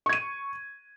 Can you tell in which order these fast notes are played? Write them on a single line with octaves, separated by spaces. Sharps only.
C#6 G#6 D#7